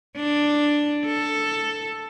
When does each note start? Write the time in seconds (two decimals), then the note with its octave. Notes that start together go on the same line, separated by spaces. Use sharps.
0.16 D4
1.06 A4